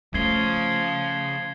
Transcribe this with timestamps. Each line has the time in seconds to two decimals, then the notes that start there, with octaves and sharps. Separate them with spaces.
0.14 C#3 F3 A3 G#6 C7 G7